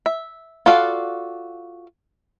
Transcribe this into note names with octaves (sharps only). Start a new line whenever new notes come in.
E5
F4 F#4 A4 D5 F5